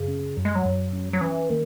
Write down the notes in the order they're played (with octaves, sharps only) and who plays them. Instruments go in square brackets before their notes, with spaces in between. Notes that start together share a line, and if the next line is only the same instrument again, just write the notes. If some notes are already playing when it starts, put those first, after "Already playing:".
Already playing: [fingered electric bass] F#2 [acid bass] C#3
[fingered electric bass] C#4
[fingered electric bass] F#2 [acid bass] F#3
[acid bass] G#3
F#3
[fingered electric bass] F#2
C#4
[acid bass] F#3
[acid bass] E3 [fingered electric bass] C#4
[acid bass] D#3 [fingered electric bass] A#3